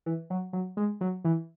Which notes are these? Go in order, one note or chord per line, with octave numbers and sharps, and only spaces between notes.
E3
F#3
F#3
G#3
F#3
E3